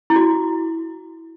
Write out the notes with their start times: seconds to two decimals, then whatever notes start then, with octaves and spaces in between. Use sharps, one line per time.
0.10 E4
0.16 F#4